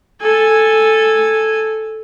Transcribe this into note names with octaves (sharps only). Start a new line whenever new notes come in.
A4 G#5